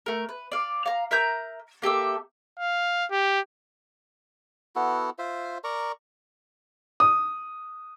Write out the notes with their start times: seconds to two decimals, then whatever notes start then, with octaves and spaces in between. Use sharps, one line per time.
0.06 A3 A#4
0.29 B4
0.52 D5 F5
0.86 F5 A#5
1.11 A#4 E5 A#5 G6
1.82 A#3 G4 A4 E5
2.59 F5
3.11 G4
4.76 B3 E4 F#4 A4
5.19 F4 C5 E5
5.64 A#4 D5 A#5 C#6
7.00 D#6